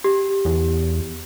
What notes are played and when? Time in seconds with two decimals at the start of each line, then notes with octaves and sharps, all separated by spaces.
0.04 G4
0.45 E2